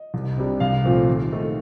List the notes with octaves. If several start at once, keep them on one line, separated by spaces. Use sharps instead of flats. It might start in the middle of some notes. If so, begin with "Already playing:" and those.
Already playing: D#5
C2
C3 G3 D4
C2 F5
A#2 F3 A3 C4
D#2
D#3 A3